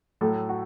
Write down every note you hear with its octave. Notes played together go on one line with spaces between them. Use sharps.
A2 F#3 A3 A4
F#4